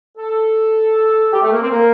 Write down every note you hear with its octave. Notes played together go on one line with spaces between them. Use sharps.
A4
G4
A3
A#3
C4
A#3